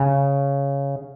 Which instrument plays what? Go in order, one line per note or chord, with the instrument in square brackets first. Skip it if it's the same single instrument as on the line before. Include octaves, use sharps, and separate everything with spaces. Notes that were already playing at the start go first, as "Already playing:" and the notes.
Already playing: [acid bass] C#3